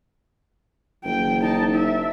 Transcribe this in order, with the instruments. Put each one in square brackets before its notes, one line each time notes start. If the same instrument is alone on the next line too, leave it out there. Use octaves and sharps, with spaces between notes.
[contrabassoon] F#1 [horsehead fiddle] G5
[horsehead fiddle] D#4 A5
E5